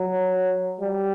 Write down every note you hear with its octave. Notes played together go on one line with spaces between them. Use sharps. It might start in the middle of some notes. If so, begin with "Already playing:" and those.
Already playing: F#3
G3